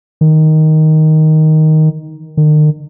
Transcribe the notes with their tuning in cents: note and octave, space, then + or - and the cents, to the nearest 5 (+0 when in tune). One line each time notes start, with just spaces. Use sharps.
D#3 +5
D#3 -40